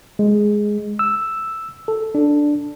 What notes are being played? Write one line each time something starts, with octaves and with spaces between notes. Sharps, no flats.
G#3
E6
A4
D4